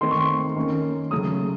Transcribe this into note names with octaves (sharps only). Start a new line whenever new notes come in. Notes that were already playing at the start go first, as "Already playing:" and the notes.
D#3 A3 C4 C6
C#6
C6
D#3 A#3 C#4
C#3 F#3 A3 D#6